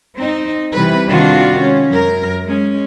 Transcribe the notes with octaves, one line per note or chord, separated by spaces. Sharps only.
C4 D#4
C3 E3 G3 B4
C3 D#3 G3 D4 F4 F#4
G#3 C#4
F#2 A#4
G#3 C#4